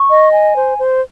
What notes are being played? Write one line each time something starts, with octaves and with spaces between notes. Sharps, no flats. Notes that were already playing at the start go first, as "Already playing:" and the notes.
Already playing: C#6
D#5
G#5
C5
C5